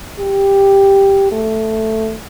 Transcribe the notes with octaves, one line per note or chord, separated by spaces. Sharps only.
G4
A3